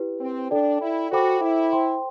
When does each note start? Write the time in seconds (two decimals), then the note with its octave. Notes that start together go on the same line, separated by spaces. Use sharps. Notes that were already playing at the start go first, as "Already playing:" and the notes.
Already playing: E4 G4 B4
0.20 C4
0.51 D4 A4 D5 G5
0.82 E4
1.11 F#4 A4 C5 G5 B5 D6
1.41 E4
1.72 C5 G5 C6